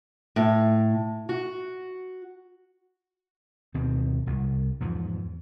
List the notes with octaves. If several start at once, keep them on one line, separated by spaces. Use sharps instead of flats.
A2
F#4
D2 B2 D#3 C4
E1 C2
E2 G#2 F3